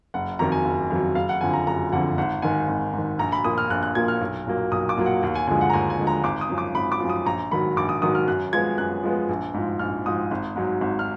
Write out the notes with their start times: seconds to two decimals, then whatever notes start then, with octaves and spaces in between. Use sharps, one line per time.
0.14 F#1 F#5
0.39 F2 D#3 F#3 A#5
0.52 G#5
0.65 F#1
0.91 F2 D#3 F#3
1.15 F#1 F5
1.29 F#5
1.41 F2 D3 F3 G#5
1.53 A#5
1.67 F#1 A#5
1.92 F2 D3 F3 F#5
2.18 G#1 F#5
2.42 G#2 D#3 G#5
2.69 G#1
2.93 G#2 D#3
3.19 A#1 A#5
3.32 B5
3.44 A#2 F3 A#3 D#6
3.58 F6
3.70 A#1 F#6
3.83 F#6
3.95 A#2 F3 A#3 G#6
4.08 F6
4.21 B1
4.46 A#2 F#3 A#3
4.72 B1 D#6
4.89 D6
4.97 A#2 F#3 A#3
5.06 F#5
5.22 D#2 F#5
5.35 G#5
5.47 D3 F3 G#3 G#5
5.61 F#5
5.70 A#5
5.73 D#2 G#5
5.90 G#5
5.99 D3 F3 G#3
6.07 A#5
6.24 G#1 D6
6.41 D#6
6.50 F#2 F3
6.58 D6
6.75 G#1 B5
6.92 D6
7.00 F#2 F3
7.10 D#6
7.26 A#1 A#5
7.51 G#2 D#3 F#3 B5
7.77 A#1 D6
7.89 D#6
8.02 G#2 D#3 F#3 D#6
8.15 F6
8.27 F#2 F#6
8.53 F3 G#3 B3 G#6
8.78 F#2 F#6
9.04 F3 G#3 B3
9.29 A#1
9.54 G#2 F3
9.79 A#1 F6
10.06 G#2 F3 D#6
10.31 G#1
10.56 G#2 F#3
10.81 G#1
10.99 F6